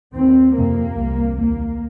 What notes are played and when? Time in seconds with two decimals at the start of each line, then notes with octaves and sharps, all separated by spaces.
0.15 D#2 C4
0.56 F2 C3 A#3
0.96 C2 C3
1.37 D#2 A#3